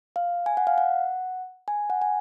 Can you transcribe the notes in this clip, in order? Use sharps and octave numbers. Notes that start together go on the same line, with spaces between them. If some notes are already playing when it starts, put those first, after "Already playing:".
F5
G#5
F#5
F5
F#5
G#5
F#5
G#5